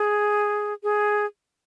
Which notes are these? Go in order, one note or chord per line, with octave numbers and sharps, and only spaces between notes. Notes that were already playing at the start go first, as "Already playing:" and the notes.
Already playing: G#4
G#4